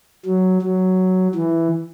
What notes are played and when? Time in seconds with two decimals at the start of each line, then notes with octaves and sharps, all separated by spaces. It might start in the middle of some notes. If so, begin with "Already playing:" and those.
0.25 F#3
0.62 F#3
1.35 E3